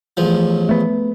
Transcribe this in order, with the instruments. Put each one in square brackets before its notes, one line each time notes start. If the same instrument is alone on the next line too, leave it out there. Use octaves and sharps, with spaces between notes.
[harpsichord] A1 E2 F3
[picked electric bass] A3 B3